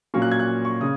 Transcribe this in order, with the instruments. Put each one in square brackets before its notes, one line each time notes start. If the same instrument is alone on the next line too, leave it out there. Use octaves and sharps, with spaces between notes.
[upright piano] A#2 F#3 A#3 C#4 C#6
F#6
G#6
F#6
C#6
C#3 D#6